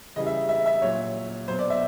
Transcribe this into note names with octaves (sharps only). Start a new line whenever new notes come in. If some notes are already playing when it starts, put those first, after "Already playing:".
C#3 E3 G3 D#5
E5
E5
E5
A#2 F#3 C#5
B2 F#3 C5
D5
E5